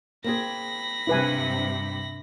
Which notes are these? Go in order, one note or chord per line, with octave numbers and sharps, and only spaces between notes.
A#3 C4 G#4 B5 A#6
G2 C3 E4 B4 G#5